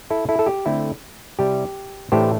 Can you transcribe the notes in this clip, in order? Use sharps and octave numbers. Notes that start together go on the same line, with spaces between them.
E4 A4
E4 A4
A4
G4
D3 A3 C4 E4
C3 G3 E4 G4
A2 E3 A3 D4 G4 C5